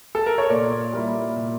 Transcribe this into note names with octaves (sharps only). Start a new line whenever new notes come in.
A4
A#4
C#5
A#2 D5
G3 A#3 E4
A#2